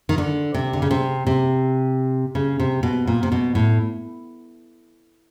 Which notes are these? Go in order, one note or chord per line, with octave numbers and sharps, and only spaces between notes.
D#3
D3
C3
D3
C#3
C3
C3
C#3
C3
B2
A#2
C3
B2
A2